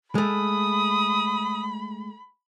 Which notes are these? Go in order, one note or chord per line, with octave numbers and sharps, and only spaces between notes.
G#3 A3 B5 D#6